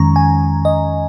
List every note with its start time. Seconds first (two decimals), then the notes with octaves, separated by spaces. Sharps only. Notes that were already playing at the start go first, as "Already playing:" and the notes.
Already playing: F2 D#3 G#3 C#4 A#5 C#6
0.16 G#5
0.65 D#5